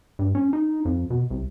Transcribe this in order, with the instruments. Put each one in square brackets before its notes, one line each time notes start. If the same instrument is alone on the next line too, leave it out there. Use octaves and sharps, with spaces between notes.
[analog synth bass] G2
C#4
D#4
F2
B2
C2